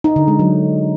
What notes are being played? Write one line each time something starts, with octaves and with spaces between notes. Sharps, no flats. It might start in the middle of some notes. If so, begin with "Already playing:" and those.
D#4
D3
G#3
F#3